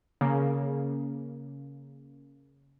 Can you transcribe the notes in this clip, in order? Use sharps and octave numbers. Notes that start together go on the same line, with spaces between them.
C#3 A#3